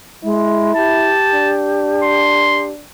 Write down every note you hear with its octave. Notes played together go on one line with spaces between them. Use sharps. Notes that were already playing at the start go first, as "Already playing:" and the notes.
G#3 E4
G4 A5
D4
C6